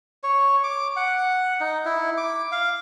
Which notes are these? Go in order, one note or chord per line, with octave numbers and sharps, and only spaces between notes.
C#5
D6
F#5
D#4
E4
D6
F5